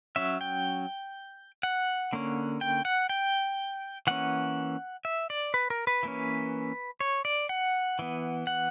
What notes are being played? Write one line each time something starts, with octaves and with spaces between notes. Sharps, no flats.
F#3 C#4 E5
G5
F#5
D3 A#3 C#4
G5
F#5
G5
E3 A#3 C#4 F#5
E5
D5
B4
A#4
B4
E3 A#3 C#4
C#5
D5
F#5
E3 B3
F#5